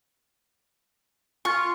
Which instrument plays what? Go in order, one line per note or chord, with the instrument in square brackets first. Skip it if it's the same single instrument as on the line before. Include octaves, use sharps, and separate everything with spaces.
[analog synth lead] F4 [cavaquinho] C#6